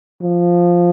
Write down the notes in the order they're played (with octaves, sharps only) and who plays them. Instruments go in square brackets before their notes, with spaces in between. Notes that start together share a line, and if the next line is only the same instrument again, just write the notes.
[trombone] F3